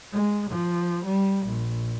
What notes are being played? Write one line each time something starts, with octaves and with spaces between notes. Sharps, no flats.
G#3
F3
G3
A#1